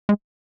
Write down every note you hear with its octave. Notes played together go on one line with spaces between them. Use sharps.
G#3